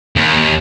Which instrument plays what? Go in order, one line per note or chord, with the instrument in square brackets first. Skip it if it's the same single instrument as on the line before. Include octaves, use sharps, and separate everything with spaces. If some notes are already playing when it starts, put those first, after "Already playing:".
[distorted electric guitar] D#2